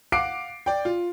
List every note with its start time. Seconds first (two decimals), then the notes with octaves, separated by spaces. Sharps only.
0.12 F5 F#5 D6 C7 D7
0.66 D5 G5
0.85 F4